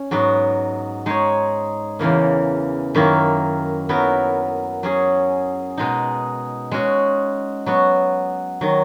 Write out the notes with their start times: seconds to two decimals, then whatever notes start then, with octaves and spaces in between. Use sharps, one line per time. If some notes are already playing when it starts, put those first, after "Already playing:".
Already playing: C#4
0.11 G#2 F#3 B3
1.06 G#3 D#4 G#4 C#5
1.99 E2 C#3 E3 A#3
2.95 F#2 D#3 A#3 E4
3.89 F#3 B3 E4 A#4
4.83 F#3 C#4 G#4
5.78 B2 G#3 D#4
6.71 G#3 C#4 F#4
7.66 F#3 B3 F#4
8.61 D#3 F#3